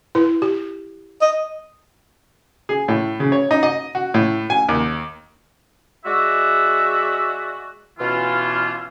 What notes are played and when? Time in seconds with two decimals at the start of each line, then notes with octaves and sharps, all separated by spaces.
0.15 E4 B4
0.42 G4
1.22 D#5
2.69 G#4
2.88 A2
3.20 C#3
3.32 C#5
3.51 D#4
3.63 D#5
3.95 F#4
4.14 A2
4.50 G#5
4.69 D#2
6.05 G#3 F#4 D5 E5
8.00 B2 E3 C#4 F4